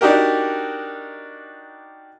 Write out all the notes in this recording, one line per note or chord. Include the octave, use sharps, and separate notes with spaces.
D4 D#4 F#4 G4 A#4